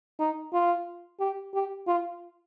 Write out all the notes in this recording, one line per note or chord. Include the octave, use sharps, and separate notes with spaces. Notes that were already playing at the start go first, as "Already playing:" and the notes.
D#4
F4
G4
G4
F4